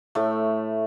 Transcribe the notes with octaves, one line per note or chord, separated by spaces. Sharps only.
A2 A3